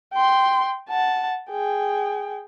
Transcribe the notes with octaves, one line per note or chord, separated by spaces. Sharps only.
G5 C6
F#5 A5
G#4 G5